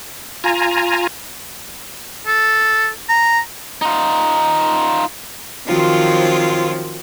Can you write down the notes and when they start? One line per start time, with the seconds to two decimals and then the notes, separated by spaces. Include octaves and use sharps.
0.44 F4 G#5 A#5
2.26 A4
3.09 A#5
3.82 D#4 F4
5.66 D#3 F3 F#3 C4 F4